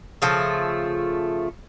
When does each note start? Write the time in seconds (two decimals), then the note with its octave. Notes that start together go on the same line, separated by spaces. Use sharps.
0.22 C#3 F3 A3